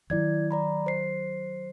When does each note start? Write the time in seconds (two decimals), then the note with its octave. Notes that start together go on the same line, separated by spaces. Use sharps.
0.10 D#3 F#3 E4 D5 G#6
0.51 D5 A#5 B5
0.86 C5 C7